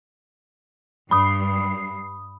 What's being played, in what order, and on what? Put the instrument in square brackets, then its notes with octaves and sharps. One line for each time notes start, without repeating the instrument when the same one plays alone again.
[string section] G2 C7 [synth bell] B5 D#6